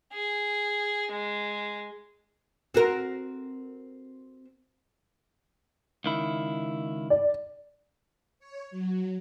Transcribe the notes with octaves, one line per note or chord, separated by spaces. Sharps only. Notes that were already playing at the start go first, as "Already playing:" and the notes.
G#4
G#3
C4 F#4 A#4
C#2 D#3 E4
D5
C#5
F#3